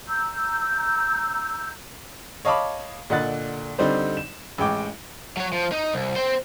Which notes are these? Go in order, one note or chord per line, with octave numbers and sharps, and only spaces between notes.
A#5 E6 G6
C#5 D#5 F5 A5 B5 D6
A#2 D3 D#5 F#5 F#6 A6
D3 G3 C4 D#4 C5 D5
E7
A1 G#3 G5 D6
F#3 C#5
F3
D#4
C2
C4 C5